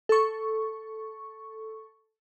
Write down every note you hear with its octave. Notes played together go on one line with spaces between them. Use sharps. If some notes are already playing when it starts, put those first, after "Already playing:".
A4 C#6